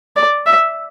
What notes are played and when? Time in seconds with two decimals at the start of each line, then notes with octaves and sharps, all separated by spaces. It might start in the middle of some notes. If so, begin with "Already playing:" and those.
0.16 D5
0.46 E5